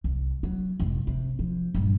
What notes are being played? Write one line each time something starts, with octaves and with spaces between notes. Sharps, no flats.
C2
F#3
F1 G#2
C3
F3
G2 A#2